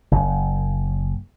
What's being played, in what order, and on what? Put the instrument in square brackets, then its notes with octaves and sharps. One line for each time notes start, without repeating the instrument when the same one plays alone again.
[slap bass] F#1